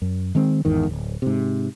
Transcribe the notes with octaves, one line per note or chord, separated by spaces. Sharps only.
F#2
D#3 G#3 C4
G#1 E2 G#2 D#3
D1
G#2 C3